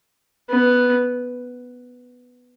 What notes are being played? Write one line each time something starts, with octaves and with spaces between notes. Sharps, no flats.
B3